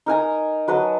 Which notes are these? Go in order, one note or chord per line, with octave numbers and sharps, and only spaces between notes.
D#4 A#4 G#5 A#5
F#3 B4 D#5 A5